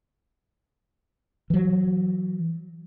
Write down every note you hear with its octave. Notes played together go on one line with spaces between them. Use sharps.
E3 F#3